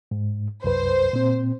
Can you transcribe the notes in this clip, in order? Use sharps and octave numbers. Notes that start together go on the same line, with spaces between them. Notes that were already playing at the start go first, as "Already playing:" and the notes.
G#2
C2 F#2 B4 C5
A#2 C4